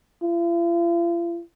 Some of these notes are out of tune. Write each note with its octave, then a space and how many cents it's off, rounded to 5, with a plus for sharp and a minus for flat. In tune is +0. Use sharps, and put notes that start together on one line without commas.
F4 -45